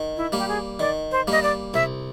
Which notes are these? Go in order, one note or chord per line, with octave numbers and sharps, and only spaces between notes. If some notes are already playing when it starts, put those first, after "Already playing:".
Already playing: D#3
E4
G3 A#3
G4
G#4
D#3 D5
C5
G3 A#3 D#5
D5
C2 E5